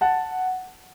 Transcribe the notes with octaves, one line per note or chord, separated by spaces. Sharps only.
F#5 A5